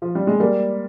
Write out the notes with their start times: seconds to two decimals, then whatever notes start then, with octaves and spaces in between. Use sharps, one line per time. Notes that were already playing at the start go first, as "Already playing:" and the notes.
0.02 F3
0.15 G3
0.27 G#3
0.40 G3 A#3